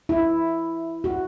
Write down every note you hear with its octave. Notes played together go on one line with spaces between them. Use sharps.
E4
F#4